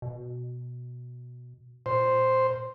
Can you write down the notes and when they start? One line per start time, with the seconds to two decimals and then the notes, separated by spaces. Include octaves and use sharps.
0.02 B2
1.86 A#2 C5